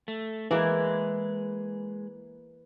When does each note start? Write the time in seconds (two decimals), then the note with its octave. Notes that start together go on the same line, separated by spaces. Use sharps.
0.08 A3
0.51 E3 G#3 A#3 E4 G#4 B4